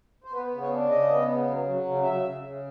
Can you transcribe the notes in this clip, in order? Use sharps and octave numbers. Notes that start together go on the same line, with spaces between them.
C5
B3 B4
C#3
C#5
D4
C#3 D#5
B3
C#3
F#3
F#3
C#3
C#3 E5
C#3
C#3